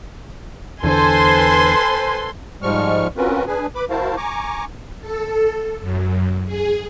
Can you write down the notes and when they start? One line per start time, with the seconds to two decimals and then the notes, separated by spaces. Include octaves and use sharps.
0.84 E2 D3 A4 B4 C5 G#5 C6
2.62 G#2 F3 G3 G#3 C#6 F6
3.17 C4 C#4 F4 F#4 A#4 B4
3.47 D4 G#4 B4 G#5
3.75 B4 B5 D6
3.90 E4 F#4 A#4 C5 F5 A5
4.17 G#5 A#5 C#6 D6
5.01 A4
5.81 F#2
6.46 G#4